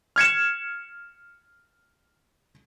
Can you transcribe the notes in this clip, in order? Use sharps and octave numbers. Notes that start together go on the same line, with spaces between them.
F6 G#6 C#7 E7